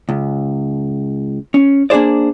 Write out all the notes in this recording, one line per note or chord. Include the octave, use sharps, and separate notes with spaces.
C#2
C#4
A#3 D4 D#4 G#4 C5 D5